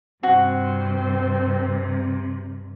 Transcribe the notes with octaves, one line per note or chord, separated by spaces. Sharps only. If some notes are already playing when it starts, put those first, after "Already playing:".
G2 C3 C4 F#4